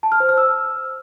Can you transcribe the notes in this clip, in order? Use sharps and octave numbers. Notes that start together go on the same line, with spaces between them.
A5
F6
C5
F6
E6